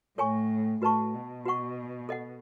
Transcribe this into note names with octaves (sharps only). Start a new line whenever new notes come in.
A2 A4 C#5 G#5 C#6
A2 F#4 B4 D#5 A5 C#6
B2
F#4 B4 F#5 C#6
A4 D#5 F#5